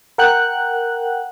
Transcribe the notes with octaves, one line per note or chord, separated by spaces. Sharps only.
A#4 F#5 G5 F#6